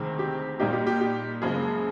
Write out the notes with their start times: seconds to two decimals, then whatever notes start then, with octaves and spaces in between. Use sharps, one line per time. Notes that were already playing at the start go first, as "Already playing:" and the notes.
Already playing: D2 C3 D#3 G#3 C4
0.19 G4
0.60 A#2 G3 A#3 D#4 G4
0.73 G4
0.87 G4
1.01 G4
1.42 F#2 C#3 F3 G#3 A#3 G#4